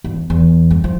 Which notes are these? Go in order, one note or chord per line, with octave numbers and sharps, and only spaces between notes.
E2
E2
G#3
F3